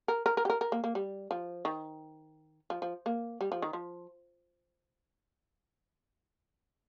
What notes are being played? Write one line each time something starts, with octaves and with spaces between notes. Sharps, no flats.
A#4
A#4
A#4
G4
A#4
A#4
A#3
A#3
G3
F3
D#3
F3
F3
A#3
G3
F3
D#3
F3